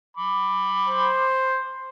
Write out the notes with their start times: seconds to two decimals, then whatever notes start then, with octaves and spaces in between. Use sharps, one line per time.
0.17 B5 D6
0.88 C5